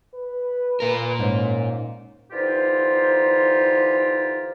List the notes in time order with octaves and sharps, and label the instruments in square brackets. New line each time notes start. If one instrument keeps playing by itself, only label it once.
[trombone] B4
[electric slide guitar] A#2 A#4
[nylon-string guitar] G#2 [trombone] C#4
[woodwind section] D3 E3 D#4 F4 G4 C5